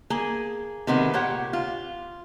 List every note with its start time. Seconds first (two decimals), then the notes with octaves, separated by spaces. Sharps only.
0.10 A#3 G#4 G#5
0.87 C3 D#3 G#3 B3
1.13 A#2 G4 C#5 F#5
1.53 F4